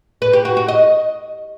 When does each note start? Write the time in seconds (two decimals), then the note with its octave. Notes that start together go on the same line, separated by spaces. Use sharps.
0.22 B4
0.33 G4
0.45 F#4
0.57 F#4
0.68 D#5